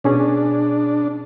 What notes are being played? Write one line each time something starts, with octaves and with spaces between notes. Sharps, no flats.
B2 C#4 D4 G#4